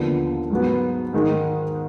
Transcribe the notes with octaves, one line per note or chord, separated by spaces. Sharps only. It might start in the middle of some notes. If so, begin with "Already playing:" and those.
Already playing: D#2 D3 F3 B3
G#2 F#3 B3
G#2 D#3 G#3 D#4